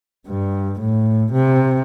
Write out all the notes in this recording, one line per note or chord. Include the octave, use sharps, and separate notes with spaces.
G2
A2
C3